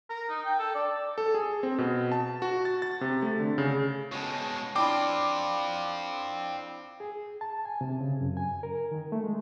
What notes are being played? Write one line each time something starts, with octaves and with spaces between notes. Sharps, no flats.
A#4
D#4
G5
A4
D5
A4
G#4
C4
B2
A5
F#4
A6
A6
C3
A3
D3
C#3
B2 G#3 C#5 A5
C4 D4 E4 F4 G5 D6
G#4
A5
G#5
C3
C#3
F#2
G#5
A#4
D#3
A3
G#3